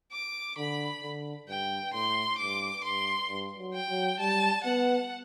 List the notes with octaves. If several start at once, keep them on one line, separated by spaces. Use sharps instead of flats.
D6
D3 B5
D3
G2 G5
A2 C6
G2 D6
G2 C6
G2
F#3
G5
F#3
G3 A5
B3 F#5